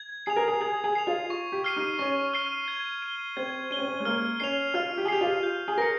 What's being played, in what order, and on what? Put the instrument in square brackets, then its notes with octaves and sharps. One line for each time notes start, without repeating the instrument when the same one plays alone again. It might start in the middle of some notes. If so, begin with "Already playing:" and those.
Already playing: [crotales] G#6
[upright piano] G#4 [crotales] C7 F7
[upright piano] A#4
G#4
[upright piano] G#4 [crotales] G#6
[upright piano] G#4
[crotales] C7 F7
[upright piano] F4
[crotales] C#6
[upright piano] G4
[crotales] F6 C7 D#7
[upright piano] D#4
[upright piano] C#4 [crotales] C#6
[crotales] F6 C7 D#7
G#6
D#7 G7
[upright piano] C4 [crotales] G#6
[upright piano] C#4 [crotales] D#7 G7
[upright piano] C4
C#4
G#3
[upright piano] A#3 [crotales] F6
[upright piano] C#4 [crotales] C7 F7
[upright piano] F4 [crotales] F6
[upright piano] G4
G#4
[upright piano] G4 [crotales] C7 F7
[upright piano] F4
[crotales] G6
[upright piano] G#4
[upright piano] A#4 [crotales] A#6 C#7